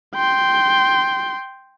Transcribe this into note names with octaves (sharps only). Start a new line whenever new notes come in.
G5 C6